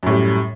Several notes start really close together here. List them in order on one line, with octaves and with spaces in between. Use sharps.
F#2 A2 G3